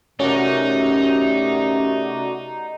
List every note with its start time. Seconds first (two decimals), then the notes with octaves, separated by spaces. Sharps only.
0.20 C3 A3 C#4 D#4 F#4 A#4 D5